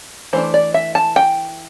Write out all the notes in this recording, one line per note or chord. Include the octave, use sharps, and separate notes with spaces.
E3 A3 D4 C5
D5
E5
A5
G5